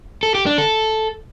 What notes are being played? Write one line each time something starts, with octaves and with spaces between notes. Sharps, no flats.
A4
G4
D4
A4